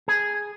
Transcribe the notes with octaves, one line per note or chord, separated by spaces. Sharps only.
G#4